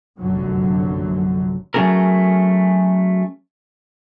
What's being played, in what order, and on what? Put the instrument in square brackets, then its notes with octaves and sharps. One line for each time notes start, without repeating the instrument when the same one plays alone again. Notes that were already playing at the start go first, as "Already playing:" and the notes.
[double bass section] F1 A#1 F#2 D3 F#3
[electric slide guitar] F#3 A3 C#4 G#4 A#4